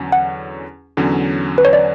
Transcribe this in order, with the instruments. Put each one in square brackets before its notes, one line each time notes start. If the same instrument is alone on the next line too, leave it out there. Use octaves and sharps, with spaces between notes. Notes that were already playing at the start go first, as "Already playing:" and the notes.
Already playing: [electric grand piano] E2 D3 F#3 C#4
[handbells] F#5
[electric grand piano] E2 D3 F#3 C#4
[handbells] B4
C#5
D5